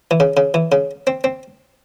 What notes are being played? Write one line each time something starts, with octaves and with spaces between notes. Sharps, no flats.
E3
C#3
C#3
E3
C#3
C4
C4